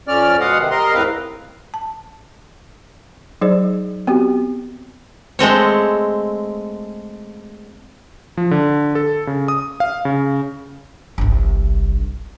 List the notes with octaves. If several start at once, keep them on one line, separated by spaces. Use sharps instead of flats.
F2 C#4 D5 F6
B2 G#3 D#5 F5 F#5
C3 D#3
G3 A#4 D#5 C6
E2 A2 C4 A#4 B4 F5
A5
F#3 D#4 G#4 C5 D5
B3 C4 F#4 G4
G#3 A3 C4 C#5
F3
D3
A4
C#3
D#6
F5
C#3
G1 C2